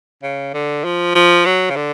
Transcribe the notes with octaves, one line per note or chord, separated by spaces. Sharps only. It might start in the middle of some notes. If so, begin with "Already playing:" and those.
C#3
D3
F3
F3
F#3
C#3
D3